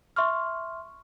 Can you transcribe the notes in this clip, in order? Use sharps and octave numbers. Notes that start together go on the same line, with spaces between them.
E5 C6 C#6 F6